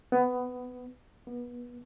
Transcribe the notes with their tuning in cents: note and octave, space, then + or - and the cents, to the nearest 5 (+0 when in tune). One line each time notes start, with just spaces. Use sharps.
B3 +15
B3 -25